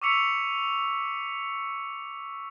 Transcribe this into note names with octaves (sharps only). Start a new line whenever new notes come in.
C#6 D6 E6 B6 C#7 F7